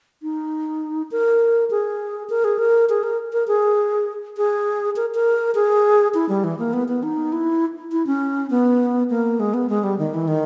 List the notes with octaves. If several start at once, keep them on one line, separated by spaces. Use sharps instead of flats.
D#4
A#4
G#4
A#4
G#4
A#4
G#4
A#4
A#4
G#4
G#4
A#4
A#4
G#4
E4
G3
E3
A#3
B3
B3
D#4
E4
E4
C#4
B3
A#3
G#3
B3
G#3
G3
D#3
E3
D#3